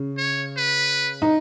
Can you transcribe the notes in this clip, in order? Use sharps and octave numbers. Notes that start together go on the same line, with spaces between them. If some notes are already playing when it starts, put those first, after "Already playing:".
Already playing: C#3
C#5
B4
D#4